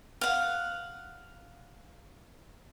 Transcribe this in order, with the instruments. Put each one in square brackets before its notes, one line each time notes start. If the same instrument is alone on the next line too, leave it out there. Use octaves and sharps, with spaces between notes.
[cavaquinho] F5 F#5